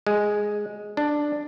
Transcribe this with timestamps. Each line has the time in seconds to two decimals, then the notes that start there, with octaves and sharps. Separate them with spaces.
0.07 G#3
0.97 D4